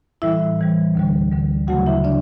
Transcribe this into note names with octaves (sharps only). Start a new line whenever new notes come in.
A2 E3 G3 E4 E5
A2 E3 G3
D2 D3 G3
D2 D3 G3
D2 C#3 F#3 A3 F#4 F#5
E4 E5
C#3 D4 D5